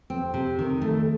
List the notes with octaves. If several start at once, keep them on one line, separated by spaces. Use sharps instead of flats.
C4
C3
D#3
A3